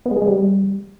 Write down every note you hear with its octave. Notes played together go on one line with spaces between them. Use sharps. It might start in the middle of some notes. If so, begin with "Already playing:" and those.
B3
G#3
G#4
G#3
G3